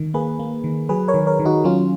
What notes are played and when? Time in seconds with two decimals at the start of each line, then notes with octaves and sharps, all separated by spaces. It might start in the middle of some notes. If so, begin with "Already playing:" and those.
Already playing: D#3
0.14 A#3 G#4 B4
0.39 A#3
0.64 D#3
0.89 F#3 G#4 B4
1.08 A#4 C#5
1.14 D#3
1.27 A#4 C#5
1.39 D#3
1.45 D#4 F#4
1.64 F#3 C#4 F4